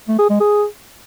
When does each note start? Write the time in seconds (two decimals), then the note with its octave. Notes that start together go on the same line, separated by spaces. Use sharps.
0.08 A3
0.19 G#4
0.30 G#3
0.40 G#4